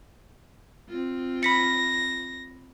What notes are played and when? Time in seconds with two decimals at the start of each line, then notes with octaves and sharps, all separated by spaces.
0.89 C4 F4
1.43 B5 A#6 B6 C#7